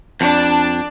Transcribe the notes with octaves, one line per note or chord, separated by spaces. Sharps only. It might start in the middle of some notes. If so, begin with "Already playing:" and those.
F2 D4 A5